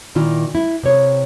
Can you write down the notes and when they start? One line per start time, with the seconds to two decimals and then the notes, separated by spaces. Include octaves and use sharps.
0.15 A#2 D#3 E4 F4
0.55 E4
0.83 C3 C#5